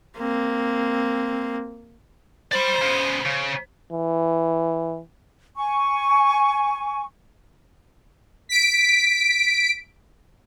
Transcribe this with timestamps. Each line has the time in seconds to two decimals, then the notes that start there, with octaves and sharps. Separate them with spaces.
0.17 A#3 C4
2.51 C5 D5 B5
2.82 C#3 B3
3.26 C#3
3.92 E3
5.57 G#5 C#6
8.49 B6 D7